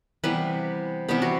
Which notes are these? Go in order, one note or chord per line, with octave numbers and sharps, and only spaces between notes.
C3 E3 G3 B3 B4
C3 E3 G3 B3 G4
F#4